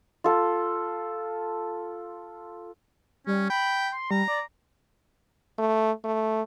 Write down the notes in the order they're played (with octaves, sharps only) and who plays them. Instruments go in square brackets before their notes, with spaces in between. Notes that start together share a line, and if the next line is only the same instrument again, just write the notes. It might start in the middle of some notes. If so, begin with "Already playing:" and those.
[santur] F4 A4
[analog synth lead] G3 [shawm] C#4
[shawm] G5 [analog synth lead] B5
[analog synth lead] C6
[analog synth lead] G3 [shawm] A#5
[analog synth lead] D5
[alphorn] A3
A3